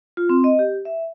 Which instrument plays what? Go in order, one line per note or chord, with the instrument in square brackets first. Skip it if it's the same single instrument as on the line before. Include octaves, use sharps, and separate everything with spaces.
[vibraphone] F4
C4
D#5
G4
E5